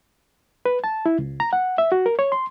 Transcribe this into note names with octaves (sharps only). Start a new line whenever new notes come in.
B4
A5
E4
C#2
A#5
F#5
E5
F#4
A#4
C#5
C6